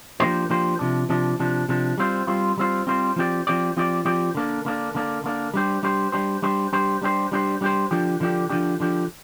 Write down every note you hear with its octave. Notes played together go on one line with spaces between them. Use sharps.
F3 A#3 D4 G4 C5
F3 A#3 D4 G4 C5
C3 F3 D4
C3 F3 D4
C3 F3 D4
C3 F3 D4
G3 C4 F4 C5
G3 C4 F4 C5
G3 C4 F4 C5
G3 C4 F4 C5
F3 C4 G4 D5
F3 C4 G4 D5
F3 C4 G4 D5
F3 C4 G4 D5
D3 A#3 D4
D3 A#3 D4
D3 A#3 D4
D3 A#3 D4
G3 D4 G4 C5
G3 D4 G4 C5
G3 D4 G4 C5
G3 D4 G4 C5
G3 D4 G4 C5
G3 D4 G4 C5
G3 D4 G4 C5
G3 D4 G4 C5
D3 F3 D4 G4
D3 F3 D4 G4
D3 F3 D4 G4
D3 F3 D4 G4